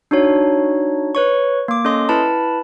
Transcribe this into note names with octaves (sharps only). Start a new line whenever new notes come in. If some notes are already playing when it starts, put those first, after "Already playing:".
D4 D#4 F#4 C#5
B4 C#5 C#6
A#3 D6
C#4 A4 D#5 C6 D#6
E4 B4 A5 B5